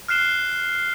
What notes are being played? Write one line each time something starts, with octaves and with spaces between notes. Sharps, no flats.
F6 F#6 C7 E7 G7